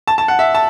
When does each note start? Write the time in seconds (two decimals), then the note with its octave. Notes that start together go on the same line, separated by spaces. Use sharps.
0.07 A5
0.18 A5
0.28 F#5
0.39 E5
0.55 A5